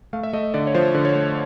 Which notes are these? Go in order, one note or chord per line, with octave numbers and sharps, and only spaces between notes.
A3 F5
E5
A3 D#5
D3 D5
C#5
F3 C5
D3
C#5
A3